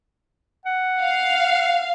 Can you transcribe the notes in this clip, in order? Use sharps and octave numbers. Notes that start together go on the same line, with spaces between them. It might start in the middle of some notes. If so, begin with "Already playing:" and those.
F#5
F5